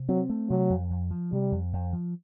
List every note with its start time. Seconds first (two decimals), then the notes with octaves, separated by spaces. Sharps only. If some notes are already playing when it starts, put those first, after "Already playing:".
Already playing: C3
0.09 F#3 C4
0.30 A3
0.49 C3 F#3
0.70 F2
0.90 F2
1.11 F3
1.32 C3 G3
1.52 F2
1.73 F2
1.93 F3